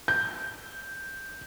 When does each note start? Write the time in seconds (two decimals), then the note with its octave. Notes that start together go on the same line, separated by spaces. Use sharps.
0.08 G6